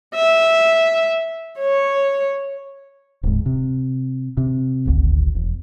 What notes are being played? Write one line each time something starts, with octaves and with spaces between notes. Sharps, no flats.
E5
C#5
D1 G#2
C3
C3
D#1 G#1 D2
E1